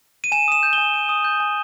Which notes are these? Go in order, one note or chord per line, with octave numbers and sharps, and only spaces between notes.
D#7
G#5 E7
D#6 E7
G6
G#5 G7
G#5
D#6
G6
G#5